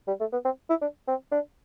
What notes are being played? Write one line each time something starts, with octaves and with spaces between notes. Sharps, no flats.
G3
A3
B3
C4
E4
D4
C4
D4